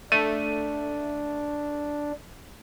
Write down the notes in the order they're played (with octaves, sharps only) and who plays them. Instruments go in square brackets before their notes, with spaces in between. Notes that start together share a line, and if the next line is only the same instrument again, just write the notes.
[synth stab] A3 [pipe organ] D4 [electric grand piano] D#7